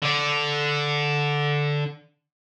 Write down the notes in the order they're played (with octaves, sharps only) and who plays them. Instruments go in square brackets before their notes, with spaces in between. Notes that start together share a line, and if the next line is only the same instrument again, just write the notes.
[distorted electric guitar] D3 D5